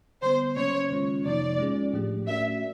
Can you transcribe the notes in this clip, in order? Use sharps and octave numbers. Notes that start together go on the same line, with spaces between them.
D3 G3 B3 C5
C#3 F#3 A#3 C#4 C#5
D#3 G#3 C#4 F4
F2 C3 F3 A#3 D#4 D5
G#3 C#4 F4 G#4
A2 F3 A3 D4 G4
A3 C#4 F#4 A#4 D5 E5